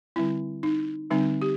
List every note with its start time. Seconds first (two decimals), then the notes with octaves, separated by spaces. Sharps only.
0.16 D3 G3 C4 E4
0.63 D#4
1.10 D3 G3 C4 D#4
1.42 G4